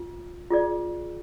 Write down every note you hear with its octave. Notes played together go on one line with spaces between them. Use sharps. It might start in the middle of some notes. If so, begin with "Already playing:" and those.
Already playing: F4
F4 G#4 D5